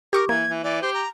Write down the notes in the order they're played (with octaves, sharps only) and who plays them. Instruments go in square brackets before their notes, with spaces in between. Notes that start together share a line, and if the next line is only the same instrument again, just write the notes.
[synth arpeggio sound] G4 C#6 D6 [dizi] A#4
[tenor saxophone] E3 [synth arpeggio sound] A#3 [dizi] G#6
[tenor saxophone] E3
[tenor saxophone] E3 [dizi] D5
[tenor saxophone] G4 [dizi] C5
[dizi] A#5